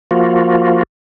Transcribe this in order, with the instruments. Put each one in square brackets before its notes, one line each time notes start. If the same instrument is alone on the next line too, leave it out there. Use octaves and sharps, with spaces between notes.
[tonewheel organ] F3 A#3 F4 F#4